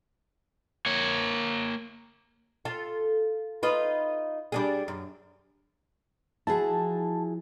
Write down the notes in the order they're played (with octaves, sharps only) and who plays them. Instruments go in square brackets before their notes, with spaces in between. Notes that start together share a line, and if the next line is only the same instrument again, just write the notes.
[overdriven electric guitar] A#3 C#5
[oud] F4 A4
D#4 F4 B4
G3 D4 G#4
F#2
[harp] F3 [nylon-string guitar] E4 F#4 G#4 [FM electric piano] A5